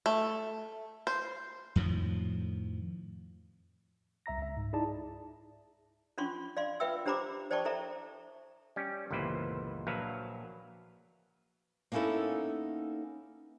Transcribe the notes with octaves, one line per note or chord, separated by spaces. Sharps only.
A3
C5
F2 A2 D#3 F3
C2 E5 A#5 A#6
C#2 E5
G#2
D#4 E4 G#4 D5 A5
C#4 D4 F4 C6 C#6
D5 F5 C6
F4 B4 E5 G5 E6
D4 G4 C5 A#5 B5 D6
C5 D5 G5 A5 C#6
E4 A4 C5 E5 A#5
G3 C#4
G1 C#2 A#2 E3 B4 C5
A#1 F#3 B4 E5 F5 A#5
A#3 B3 C#4 D#4 E4 A4